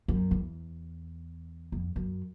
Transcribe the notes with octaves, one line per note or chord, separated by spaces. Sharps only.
F#2
E2
F2
F#2